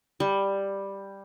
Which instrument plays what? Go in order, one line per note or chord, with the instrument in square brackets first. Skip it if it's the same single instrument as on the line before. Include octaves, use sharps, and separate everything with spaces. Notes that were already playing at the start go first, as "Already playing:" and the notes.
[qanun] G3